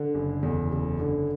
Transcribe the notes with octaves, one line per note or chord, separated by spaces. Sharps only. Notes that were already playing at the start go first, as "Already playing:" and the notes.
Already playing: D3 A4
F#1
E2
F#1
D3